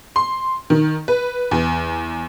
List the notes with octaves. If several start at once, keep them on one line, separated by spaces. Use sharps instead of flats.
C6
D#3
B4
E2